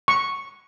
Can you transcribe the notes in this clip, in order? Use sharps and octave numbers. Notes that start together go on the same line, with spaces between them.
C#6